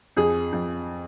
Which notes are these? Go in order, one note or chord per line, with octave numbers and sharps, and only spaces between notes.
F2 G#4
F2